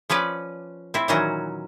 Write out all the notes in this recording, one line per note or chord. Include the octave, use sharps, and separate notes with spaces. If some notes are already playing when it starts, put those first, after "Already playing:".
F3 C#4 B4 D5
C4 E4
A#2 D#3 E3 F#3 C#4 F#4